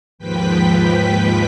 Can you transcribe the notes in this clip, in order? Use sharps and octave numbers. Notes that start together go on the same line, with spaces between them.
D#2 G#2 F3 B4 G5 B6